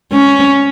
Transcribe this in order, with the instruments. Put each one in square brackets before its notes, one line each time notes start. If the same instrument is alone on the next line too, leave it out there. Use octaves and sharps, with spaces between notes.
[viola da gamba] C#4